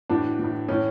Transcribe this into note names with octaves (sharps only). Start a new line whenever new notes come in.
A2 E3 D4 F#4
A2 E3
A2 E3 C#4 E4